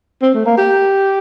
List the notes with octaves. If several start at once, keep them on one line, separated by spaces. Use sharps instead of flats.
C4
A3
A#3
G4